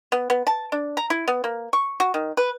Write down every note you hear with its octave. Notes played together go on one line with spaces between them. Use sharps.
B3
B3
A5
D4
A#5
E4
B3
A#3
C#6
F#4
D#3
B4